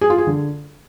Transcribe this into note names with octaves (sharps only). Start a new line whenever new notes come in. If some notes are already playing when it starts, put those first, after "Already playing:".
G#4
F4
G#4
D3